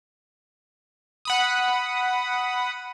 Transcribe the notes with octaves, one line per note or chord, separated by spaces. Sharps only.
F#5 B5 D#6